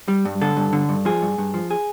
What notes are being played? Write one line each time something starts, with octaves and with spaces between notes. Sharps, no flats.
G3
G2
D3 A4
G2
D3
G2
F3 G#4
G2
G2
F3
G#4